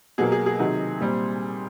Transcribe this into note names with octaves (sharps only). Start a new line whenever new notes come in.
B2 F#3 A#3 G#4
G#4
G#4
C3 D#3 F#3
A#2 G3 C4